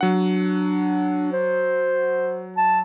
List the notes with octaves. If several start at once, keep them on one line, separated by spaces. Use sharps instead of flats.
F#3 D4 F#5
C5
A5